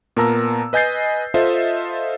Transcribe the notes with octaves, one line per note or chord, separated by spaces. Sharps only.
A#2 B3 A#4 A5 A#5 E6
B4 D#5 G#5 G6 A6 C7
F4 A4 C5 D#5 E5